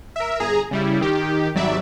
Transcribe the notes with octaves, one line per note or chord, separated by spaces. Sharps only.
A#4 E5
G1 G#4 A#5
C#3 G3 E4
D#3 G4
G#1 F#3 G3 D5 E5